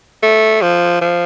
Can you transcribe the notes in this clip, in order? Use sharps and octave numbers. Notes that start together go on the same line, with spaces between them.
A3
F3
F3